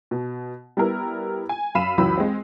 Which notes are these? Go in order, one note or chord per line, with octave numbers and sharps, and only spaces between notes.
B2
G3 B3 E4 A#4
G#5
F#2 F5 B5 B6 D#7 E7
C#2 F#2 E3 F#3 B5 E6
G#3 C4